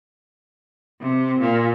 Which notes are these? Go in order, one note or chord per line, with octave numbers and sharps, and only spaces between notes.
C3
A#2